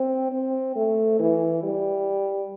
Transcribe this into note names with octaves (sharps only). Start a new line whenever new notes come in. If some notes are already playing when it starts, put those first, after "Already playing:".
Already playing: C4
C4
A3
E3
G3